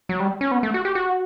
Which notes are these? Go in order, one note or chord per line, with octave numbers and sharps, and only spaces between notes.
F#3
G3
C#4
B3
A3
F#4
G4
F#4